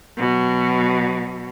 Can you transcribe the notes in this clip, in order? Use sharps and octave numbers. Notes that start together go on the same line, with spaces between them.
B2 F#3